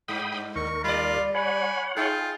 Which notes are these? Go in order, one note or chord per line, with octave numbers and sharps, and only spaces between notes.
G2 G5 B5 D#6
D#2 A#4 C#6
G3 F4 D5 B5
C#5 F#5 G#5 B5
D#4 F4 G#4 G5